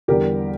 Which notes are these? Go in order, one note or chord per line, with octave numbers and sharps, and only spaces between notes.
E2 D3 G3 G4 A#4